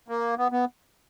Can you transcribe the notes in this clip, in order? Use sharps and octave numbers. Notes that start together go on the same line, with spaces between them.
A#3
B3
B3